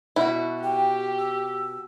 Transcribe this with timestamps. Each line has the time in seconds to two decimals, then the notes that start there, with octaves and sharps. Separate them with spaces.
0.16 B2 E4 F#4
0.63 G4 G5
1.18 E6